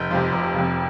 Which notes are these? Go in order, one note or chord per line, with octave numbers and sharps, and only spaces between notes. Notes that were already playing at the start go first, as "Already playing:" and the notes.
Already playing: F1 G6
F2 C3 F3
F1
F2 C3 F3